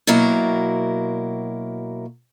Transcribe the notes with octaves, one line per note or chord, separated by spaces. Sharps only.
B2 F#3 A#3 E4 A#4